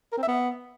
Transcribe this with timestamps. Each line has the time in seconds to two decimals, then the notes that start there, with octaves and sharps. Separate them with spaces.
0.12 A#4
0.17 C4
0.23 E5
0.28 B3